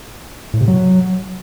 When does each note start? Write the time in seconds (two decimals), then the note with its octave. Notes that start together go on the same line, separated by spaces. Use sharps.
0.54 A2
0.61 C3
0.68 F#3